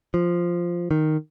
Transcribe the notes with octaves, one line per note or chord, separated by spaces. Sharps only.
F3
D#3